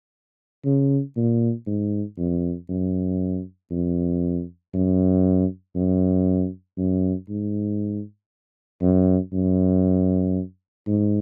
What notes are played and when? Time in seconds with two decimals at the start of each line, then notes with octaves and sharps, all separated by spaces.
0.64 C#3
1.16 A#2
1.67 G#2
2.18 F2
2.69 F#2
3.71 F2
4.74 F#2
5.75 F#2
6.77 F#2
7.29 G#2
8.82 F#2
9.33 F#2
10.87 G#2